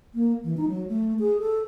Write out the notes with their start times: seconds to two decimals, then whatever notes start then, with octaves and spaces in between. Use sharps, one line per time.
0.14 A#3
0.44 E3
0.57 D#4
0.68 F#3
0.88 A3
1.19 G#4
1.39 A4